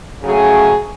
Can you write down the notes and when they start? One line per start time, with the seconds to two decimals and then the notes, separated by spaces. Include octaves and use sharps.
0.23 C#3 F#3 A3 G#4